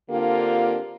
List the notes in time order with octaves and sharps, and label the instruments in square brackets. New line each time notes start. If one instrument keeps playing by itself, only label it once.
[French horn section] D3 A#3 C4 D4 F4 G4